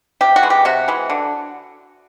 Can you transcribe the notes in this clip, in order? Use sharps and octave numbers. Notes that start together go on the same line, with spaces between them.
C3 G4
F#4
E3 G#3
G4
C3 F#4
E3 G#3
D3